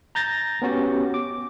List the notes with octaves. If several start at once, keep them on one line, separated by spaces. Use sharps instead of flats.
A#5 G6 A6 A#6
B3 C#4 F#4 G4
D6